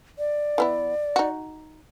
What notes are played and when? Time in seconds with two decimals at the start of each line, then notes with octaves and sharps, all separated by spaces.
0.18 D5
0.58 E3 B3 E4
1.16 D#4 F#4